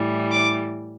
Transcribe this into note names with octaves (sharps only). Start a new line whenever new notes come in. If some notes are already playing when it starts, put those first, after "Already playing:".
Already playing: A2 E3 G3
D6